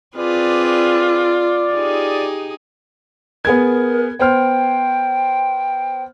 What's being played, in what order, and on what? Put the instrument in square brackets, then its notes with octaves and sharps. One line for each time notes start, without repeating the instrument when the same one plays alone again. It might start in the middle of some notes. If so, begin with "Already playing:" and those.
[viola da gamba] C4 G#4 B4 [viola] F4 [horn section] D5
[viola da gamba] D#4 G4 G#4
[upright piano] B3 G#4 G#6 [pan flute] A#4
[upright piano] B3 C5 F6 [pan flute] G5